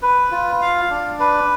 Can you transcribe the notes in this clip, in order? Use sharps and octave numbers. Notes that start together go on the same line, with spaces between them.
B4
F4
F5
D4
B4